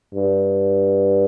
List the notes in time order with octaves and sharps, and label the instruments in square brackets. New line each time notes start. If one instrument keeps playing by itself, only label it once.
[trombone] G2